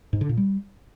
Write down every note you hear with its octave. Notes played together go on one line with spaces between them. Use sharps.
G#2
D3
A#2
G3